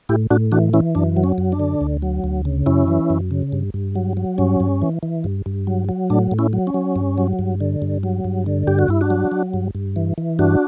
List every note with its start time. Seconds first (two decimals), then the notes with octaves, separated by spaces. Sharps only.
0.09 A2 E4 G4
0.30 A2 D4 F#4
0.52 E3 D4 F#4
0.73 E3 C#4 E4
0.95 F#2 D4
1.16 F#3
1.24 C#4
1.38 F#2
1.52 D4
1.60 D3
1.81 D2
2.02 F#3
2.24 D2
2.45 C#3
2.66 F#2 C#4 E4
2.88 E3
3.10 F#2
3.31 C#3
3.52 G2
3.74 G2
3.95 F#3
4.17 F#3
4.38 G2 C#4
4.60 G2
4.82 E3
5.03 E3
5.24 G2
5.46 G2
5.67 F#3
5.89 F#3
6.10 A2 D4
6.31 A2
6.39 C#4 E4
6.53 F#3
6.67 C#4
6.74 F#3
6.96 G2
7.18 F#3
7.39 G2
7.60 D3
7.82 G2
8.03 F#3
8.24 G2
8.46 D3
8.67 G2 G4
8.79 F#4
8.88 G2 E4
9.01 D4 F#4
9.10 F#3
9.32 F#3
9.54 G2
9.75 G2
9.96 E3
10.18 E3
10.39 G2 D4 F#4